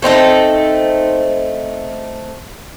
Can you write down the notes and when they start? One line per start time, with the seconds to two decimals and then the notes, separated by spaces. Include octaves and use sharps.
0.02 A3 C4 D#4 A4